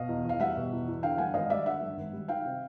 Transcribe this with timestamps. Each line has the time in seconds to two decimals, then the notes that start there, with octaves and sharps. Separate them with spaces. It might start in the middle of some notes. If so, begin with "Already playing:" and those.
Already playing: B2 D#5 F5
0.09 E2
0.25 E2 F5
0.40 G3 E5 F#5
0.57 B2
0.72 E2
0.87 E2
1.03 D3 F5 G5
1.18 G2 F#5 G#5
1.34 G#1 D#5 F5
1.50 G3 D5 E5
1.66 D3 E5 F#5
1.81 G2
1.97 G#1
2.13 G3
2.28 D#3 F5 G5
2.45 C3